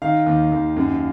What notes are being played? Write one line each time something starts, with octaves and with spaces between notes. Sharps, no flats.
D#3 F5
D#2
D#2
F#2